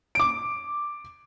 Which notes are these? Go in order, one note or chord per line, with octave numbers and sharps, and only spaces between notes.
D6 D7